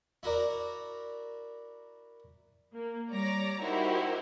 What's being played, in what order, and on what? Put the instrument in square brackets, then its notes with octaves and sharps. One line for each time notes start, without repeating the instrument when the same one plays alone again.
[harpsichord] E4 F#4 A#4 D5
[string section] A#3
G3 C#5 D5 A#5 A#6
D#4 E4 F#4 G4 A#4 C5